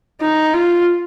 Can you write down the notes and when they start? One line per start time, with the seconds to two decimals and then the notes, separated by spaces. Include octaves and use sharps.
0.21 D#4
0.54 F4